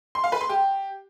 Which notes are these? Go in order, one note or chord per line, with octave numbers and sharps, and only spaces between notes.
C6
F5
B4
C6
G4